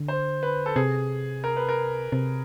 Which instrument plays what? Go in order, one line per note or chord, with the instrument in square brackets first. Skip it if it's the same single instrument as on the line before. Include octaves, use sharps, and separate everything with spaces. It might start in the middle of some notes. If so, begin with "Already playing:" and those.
Already playing: [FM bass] D3
[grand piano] C5
B4
A4
[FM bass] C3 [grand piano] G#4
[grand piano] A#4
B4
A#4
[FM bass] C3